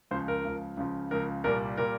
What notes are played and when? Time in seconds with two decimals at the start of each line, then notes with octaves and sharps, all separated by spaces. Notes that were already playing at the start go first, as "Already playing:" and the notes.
0.11 C#2 C#3 F3 C5
0.28 A#4
0.45 C#2 C#3 F3
0.77 C#2 C#3 F3
1.11 C#2 C#3 F3 A#4
1.44 C2 A#2 G3 A#4
1.77 A#2 G3 A#4